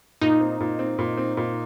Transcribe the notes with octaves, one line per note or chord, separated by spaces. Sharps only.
A#2 D#4
C4
A#2
C4
A#2
C4
A#2